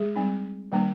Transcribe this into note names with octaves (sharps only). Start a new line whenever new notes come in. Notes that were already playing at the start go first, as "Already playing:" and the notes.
Already playing: G#3 G#4
G3 C4 D#4
D#3 G3 A#3 D4